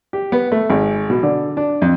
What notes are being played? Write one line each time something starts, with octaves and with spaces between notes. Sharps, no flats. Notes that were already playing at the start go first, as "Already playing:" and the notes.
G4
B3
A3
G#1
B2
D3
D4
F2